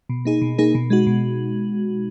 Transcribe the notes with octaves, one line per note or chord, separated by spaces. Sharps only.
B2
A#3 D#4 G#4
B2
A#3 D#4 G#4
B2
G#3 D#4 F#4
B2